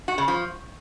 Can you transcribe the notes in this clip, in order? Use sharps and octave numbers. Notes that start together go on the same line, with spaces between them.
F#4
C#3
F3